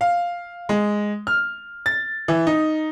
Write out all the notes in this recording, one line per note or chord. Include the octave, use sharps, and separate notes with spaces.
F5
G#3
F6
A6
E3
D#4